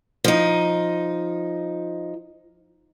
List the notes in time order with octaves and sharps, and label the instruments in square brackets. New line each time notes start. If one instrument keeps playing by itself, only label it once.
[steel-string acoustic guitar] F3 D#4